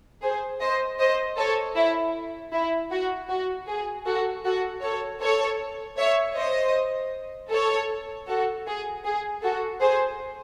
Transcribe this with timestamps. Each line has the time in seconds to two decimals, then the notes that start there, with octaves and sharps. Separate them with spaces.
0.22 G#4 C5
0.60 C5 D#5
0.99 C5 D#5
1.37 A4 C#5
1.76 E4
2.53 E4
2.91 F#4
3.29 F#4
3.68 G#4
4.06 F#4 A4
4.45 F#4 A4
4.82 A4 C#5
5.20 A4 C#5
5.98 C#5 E5
6.35 C5 D#5
7.50 A4 C#5
8.28 F#4 A4
8.66 G#4
9.04 G#4
9.43 F#4 A4
9.81 G#4 C5